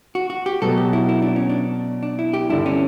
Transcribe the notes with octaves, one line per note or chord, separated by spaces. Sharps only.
F#4
F#4
G4
B2 F#3 B3 F#4 A4
G4
E4
E4
D4
C#4
D4
D4
E4
G4
G2 D3 G3 E4
C#4